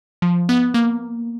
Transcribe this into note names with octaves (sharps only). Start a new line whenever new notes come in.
F3
B3
A#3